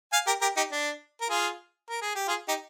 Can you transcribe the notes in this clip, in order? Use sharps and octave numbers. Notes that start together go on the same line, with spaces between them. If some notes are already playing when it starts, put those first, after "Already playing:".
F5 G#5
G4 A#4
G4 A#4
D#4 G4
D4
A#4
F4 G#4
A#4
G#4
G4
F4 G#4
D#4 G4